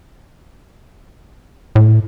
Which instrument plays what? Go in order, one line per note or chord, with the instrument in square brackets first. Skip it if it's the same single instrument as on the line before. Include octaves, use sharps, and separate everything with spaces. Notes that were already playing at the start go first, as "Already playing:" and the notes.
[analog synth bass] A2